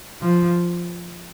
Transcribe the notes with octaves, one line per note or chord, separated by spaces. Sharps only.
F3